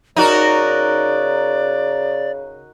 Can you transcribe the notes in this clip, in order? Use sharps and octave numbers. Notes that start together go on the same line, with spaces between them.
C#3 D#4 F#4 A#4 D5